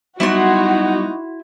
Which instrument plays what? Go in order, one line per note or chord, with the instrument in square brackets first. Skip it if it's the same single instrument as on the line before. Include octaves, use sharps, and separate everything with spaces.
[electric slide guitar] F#3 G3 B3 [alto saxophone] D#4 [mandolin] E4 C6 [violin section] F#4